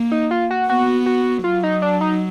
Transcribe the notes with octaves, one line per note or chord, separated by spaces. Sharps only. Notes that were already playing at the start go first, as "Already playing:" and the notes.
Already playing: A#3
D#4
F4
F#4
B3 F#4
F#4
F#3 F4
D#4
D4
D#4